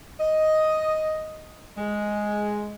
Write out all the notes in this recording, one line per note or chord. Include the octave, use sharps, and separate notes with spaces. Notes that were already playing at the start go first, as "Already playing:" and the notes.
D#5
G#3